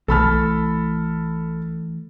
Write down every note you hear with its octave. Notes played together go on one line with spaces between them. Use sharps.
B1 E3 A3 A4 A5 B5 F6